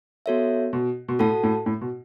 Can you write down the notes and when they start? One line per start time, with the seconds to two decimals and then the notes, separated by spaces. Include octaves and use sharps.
0.26 B3 F#4 A4 C#5 E5
0.73 B2
1.08 B2
1.19 A2 F#4 A4 F#5 A5
1.43 A2
1.66 A2
1.81 B2